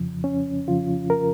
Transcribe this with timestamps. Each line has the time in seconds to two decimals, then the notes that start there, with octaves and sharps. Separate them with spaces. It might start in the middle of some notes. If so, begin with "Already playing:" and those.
Already playing: F2 C#3 F3
0.24 C#4
0.67 F2 C#3 F3 F4
1.10 A#4